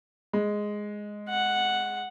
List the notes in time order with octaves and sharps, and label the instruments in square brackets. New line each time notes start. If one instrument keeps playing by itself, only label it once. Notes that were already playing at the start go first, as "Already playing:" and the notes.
[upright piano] G#3
[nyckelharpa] F#5